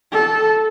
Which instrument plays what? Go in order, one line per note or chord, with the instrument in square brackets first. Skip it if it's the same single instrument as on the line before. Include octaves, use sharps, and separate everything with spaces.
[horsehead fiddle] A4